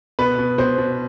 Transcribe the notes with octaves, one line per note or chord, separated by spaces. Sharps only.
B2 B4
B2
B2 C5
B2